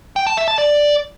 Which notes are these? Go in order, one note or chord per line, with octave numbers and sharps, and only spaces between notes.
G5
A5
E5
A5
D5